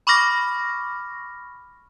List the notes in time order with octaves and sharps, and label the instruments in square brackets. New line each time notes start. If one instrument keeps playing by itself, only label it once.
[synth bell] B5 C#6 D6 F6 A#6